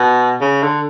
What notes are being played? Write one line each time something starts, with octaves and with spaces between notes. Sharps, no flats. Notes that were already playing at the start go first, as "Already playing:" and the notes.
Already playing: B2
C#3
D3